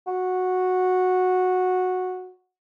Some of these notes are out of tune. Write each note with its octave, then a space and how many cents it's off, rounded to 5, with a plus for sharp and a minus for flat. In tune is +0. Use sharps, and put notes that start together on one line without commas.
F#4 -10